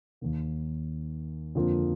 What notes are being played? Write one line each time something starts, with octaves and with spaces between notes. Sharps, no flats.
D#2 D#3 A#3
F2 D3 F3 A#3